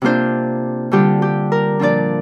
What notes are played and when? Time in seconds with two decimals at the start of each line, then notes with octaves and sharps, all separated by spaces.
0.02 C3 A#3 D4 F4 C5
0.92 D3 G3 D4 F4 G4
1.22 G4
1.52 A#4
1.79 A#2 F3 D4 F4 D5